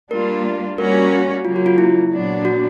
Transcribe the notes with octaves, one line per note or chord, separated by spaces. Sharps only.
G3 A#3 D4 F4 A#4
G3 A#3 C#4 F#4 A#4
C#3 F#3 A#3 F4
F#4
F4
E4
A#2 F#3 B3 D4
F#4